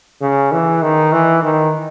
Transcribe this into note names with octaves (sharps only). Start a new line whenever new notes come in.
C#3
E3
D#3
E3
D#3